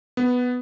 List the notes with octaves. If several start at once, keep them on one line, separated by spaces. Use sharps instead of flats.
B3